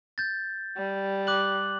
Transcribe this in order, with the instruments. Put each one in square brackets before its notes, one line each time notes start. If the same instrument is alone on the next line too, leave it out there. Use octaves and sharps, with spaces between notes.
[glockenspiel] G6 A6
[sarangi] G3
[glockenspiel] D6 F#6 F#7